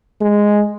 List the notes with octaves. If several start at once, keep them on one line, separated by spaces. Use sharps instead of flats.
G#3